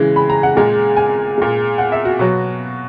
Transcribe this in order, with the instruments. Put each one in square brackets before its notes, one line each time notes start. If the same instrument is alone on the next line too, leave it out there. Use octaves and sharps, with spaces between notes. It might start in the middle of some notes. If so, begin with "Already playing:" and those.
Already playing: [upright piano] C#3 E3 G#3
B5
A#5
F#5
A#2 G#3
G#5
A#2 G#3
F#5
E5
F#4
B2 F#3